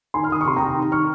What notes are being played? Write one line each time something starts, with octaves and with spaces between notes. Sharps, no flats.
D#3 G#5 C6
F6
D#3 D#6
C#6
C3 C6
G5 A#5
C3
D#3
D#3 C#6 F6